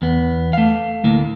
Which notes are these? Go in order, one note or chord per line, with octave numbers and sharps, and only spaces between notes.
E2 B3
A3 F5
D2 A2 A#3